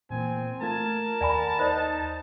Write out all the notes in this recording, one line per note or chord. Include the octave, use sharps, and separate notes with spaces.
A#2 E3 A#3 C4 G#5
A3 F4 A#4 A5 G#6
D#2 D5 F#5 G#5 B5 A#6
D#4 C5 D5